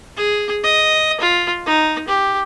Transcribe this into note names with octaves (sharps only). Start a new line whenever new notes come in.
G#4
D#5
F4
D#4
G4